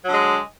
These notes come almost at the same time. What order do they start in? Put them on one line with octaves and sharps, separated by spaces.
F#3 D3 G#3